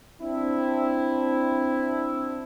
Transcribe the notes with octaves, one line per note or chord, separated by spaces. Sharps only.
C4 D4 E4